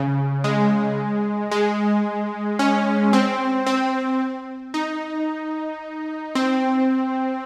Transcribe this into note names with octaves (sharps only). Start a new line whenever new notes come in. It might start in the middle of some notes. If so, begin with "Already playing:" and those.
Already playing: C#3
G#3
G#3
C#4
C4
C4
D#4
C4